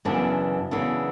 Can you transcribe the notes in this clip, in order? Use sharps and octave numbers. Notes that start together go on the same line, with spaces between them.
F#2 C#3 E3 B3 D4
F#2 C#3 E3 B3 D4